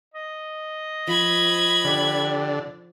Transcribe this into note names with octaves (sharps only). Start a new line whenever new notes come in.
D#5
F3 B5 G#6
D3 G4